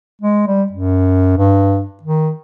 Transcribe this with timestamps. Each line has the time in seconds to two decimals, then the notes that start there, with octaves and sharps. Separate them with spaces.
0.22 G#3
0.47 G3
0.72 F#2
1.38 G2
2.03 D#3